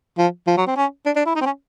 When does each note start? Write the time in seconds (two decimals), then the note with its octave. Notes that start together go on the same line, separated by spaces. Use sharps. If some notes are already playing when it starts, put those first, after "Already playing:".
0.18 F3
0.47 F3
0.57 F#3
0.67 C4
0.76 C#4
1.06 D4
1.16 D4
1.26 E4
1.36 D#4
1.41 C4
1.46 C#4